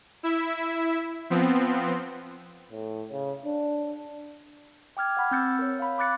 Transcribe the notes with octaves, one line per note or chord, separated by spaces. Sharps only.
E4 E5
F3 B3 C4
A2
C#3
D4
G5 D6 F6 G#6
F#5 B5
C4 E6 G6 A6 C#7
A#4 C#5
F5 B5
B5 D6 F#6 A6 C#7